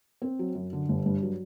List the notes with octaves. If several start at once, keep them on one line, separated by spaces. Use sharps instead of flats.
C4
F#3
F#2
D3
G1
G2
F#3